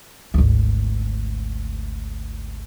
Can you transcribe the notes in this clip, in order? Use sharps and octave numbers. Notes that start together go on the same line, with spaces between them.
G#1 D2